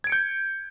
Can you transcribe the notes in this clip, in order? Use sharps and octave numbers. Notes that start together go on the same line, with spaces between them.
G6 G#6 C#7 D7